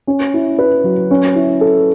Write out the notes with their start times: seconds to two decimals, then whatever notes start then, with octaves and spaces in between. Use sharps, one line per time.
0.07 C#4
0.34 E4
0.59 B4
0.84 F#3
1.11 C#4
1.35 E4
1.61 A4